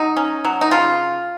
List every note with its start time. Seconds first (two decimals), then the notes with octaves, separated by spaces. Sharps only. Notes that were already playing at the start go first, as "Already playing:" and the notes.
Already playing: F#3 D#4
0.16 C#4
0.45 F#3
0.61 D#4
0.71 C#3 F4